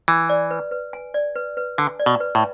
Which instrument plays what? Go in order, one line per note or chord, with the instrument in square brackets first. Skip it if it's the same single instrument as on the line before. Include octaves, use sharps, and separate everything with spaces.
[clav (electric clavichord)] E3 [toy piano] G#5
[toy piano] D5
B4
B4
G#5
D5
B4
B4
[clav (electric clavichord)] D3 [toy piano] G#5
[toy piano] D5
[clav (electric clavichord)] B2
[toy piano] B4
[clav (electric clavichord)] A2